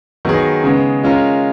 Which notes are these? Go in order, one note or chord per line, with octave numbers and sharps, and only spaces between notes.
D#3 F#3 B3 D#4 G#4
C#3 G#3 B3
G#3 C#4 F4 A#4